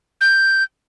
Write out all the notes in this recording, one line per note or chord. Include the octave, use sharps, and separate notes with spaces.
G6